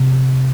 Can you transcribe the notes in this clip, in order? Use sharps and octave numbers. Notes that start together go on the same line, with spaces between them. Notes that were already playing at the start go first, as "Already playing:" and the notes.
Already playing: C3